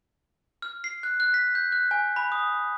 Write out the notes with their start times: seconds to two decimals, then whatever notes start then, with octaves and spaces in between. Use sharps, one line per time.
0.62 F6
0.84 C7
1.03 F#6
1.20 F#6
1.34 B6
1.55 G6
1.72 F#6
1.91 G#5
2.16 B5
2.32 D#6